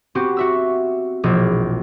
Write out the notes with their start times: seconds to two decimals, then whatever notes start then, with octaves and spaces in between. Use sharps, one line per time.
0.15 B3 C4 F#4 G4
0.37 F#4 E5 E6
1.23 E1 A#1 G#4